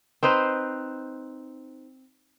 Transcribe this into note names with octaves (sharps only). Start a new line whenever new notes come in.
C4 D#4 B4 C5